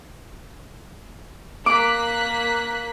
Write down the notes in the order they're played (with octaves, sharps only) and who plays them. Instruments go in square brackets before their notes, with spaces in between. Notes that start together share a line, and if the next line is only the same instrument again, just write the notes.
[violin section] A#3 F#6 B6 [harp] D6